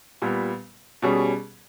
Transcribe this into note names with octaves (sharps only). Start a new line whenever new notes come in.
A#2 G3 B3
B2 G3 C#4 G#4